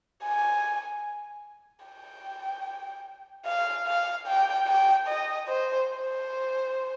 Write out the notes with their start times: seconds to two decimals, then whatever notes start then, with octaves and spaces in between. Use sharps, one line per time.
0.24 G#5
1.86 G5
3.46 F5
3.87 F5
4.27 G5
4.68 G5
5.08 D#5
5.48 C5
5.89 C5